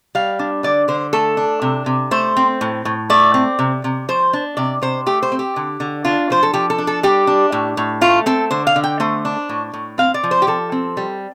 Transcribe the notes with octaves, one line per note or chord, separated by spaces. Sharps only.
G3 F5
D4
D3 D5
D3 C5
A3 A4
D4
C3
C3
A3 C5
C4
A2
A2
A3 D5
C4
C3
C3
F3 C5
D4
C3 D5
C3 C5
A3 G4
C5
C4
G4
D3
D3
D4 F4
F3 C5
A4
F3 G4
A4
D4
A4
G3 G4
D4
A2
A2
A3 F4
C4 A4
D3 C5
F5
D3
G5
A3 C5
D4
A2
A2
C4 F5
D5
F3
C5
G4
F3 A4
C4
G3